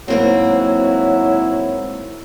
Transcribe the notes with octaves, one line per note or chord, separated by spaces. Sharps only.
G#2 F#3 A#3 C4 E4